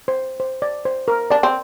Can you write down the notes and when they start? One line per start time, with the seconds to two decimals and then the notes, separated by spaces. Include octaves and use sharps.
0.08 C5
0.40 C5
0.62 D5
0.85 C5
1.08 A#4
1.30 D4 D5
1.43 C4